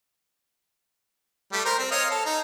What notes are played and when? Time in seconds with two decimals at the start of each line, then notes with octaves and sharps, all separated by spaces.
1.53 G3 A3
1.65 A#4 C5
1.79 C4
1.91 C#5 D#5 F5
2.11 A4
2.25 D#4